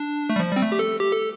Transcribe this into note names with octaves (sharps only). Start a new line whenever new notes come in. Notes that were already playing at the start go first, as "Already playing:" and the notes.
Already playing: D4
A3
G3
F3
G3
C4
A3
G4
A4
G4
A4